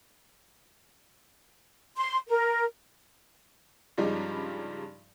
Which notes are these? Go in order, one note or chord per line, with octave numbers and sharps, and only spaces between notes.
C6
A#4
G2 C#3 F3 G3 G#3 D#4